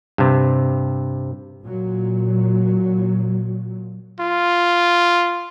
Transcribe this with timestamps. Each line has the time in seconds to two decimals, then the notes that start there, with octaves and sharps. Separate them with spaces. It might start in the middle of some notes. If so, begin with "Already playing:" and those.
0.18 G2 C3
1.63 A#2 F#3
4.20 F4